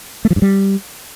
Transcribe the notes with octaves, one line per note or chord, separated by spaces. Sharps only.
A3
F3
G2
G3